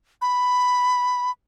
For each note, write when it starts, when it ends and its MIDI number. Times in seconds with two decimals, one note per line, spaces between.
0.22 1.31 83